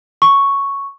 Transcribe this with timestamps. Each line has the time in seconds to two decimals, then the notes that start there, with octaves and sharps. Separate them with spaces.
0.22 C#6